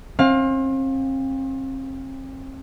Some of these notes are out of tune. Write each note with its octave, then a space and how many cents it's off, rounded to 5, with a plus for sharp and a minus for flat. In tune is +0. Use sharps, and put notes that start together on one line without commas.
C4 +40 F5 +20